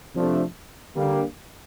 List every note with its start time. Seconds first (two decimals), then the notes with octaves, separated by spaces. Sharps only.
0.13 C3 F3 A3 D4
0.95 D3 G3 A#3